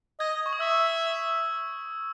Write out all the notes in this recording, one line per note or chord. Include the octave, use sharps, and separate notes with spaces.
D#5 G#6
C#6
D#6
E5 E6